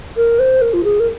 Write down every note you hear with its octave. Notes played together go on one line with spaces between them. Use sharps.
A#4
C5
A#4
F4
G#4
A#4